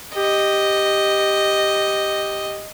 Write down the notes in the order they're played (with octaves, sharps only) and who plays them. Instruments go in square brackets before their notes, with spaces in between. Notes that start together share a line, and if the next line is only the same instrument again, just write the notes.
[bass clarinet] G4 [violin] D#5